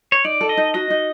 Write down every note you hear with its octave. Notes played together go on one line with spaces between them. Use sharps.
C#5
D#4 D5
A4
D#5
D#4
F#4 D#5
D#4